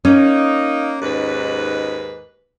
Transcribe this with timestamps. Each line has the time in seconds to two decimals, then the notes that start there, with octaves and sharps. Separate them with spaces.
0.05 A#3 C#4 D#4
1.02 D#2 G#2 B4